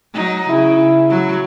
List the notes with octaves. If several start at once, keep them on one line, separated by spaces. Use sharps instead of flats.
F#3 D#4
C#3 E4
F#3